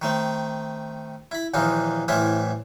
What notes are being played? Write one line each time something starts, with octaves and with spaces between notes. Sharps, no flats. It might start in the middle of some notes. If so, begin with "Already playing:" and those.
D#3 A3 C4
E4 B5
A#1 D#2 E3 D#4 F4
C2 A2 E3 E4 F4 E5